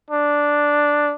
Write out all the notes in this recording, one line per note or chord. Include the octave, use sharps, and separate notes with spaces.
D4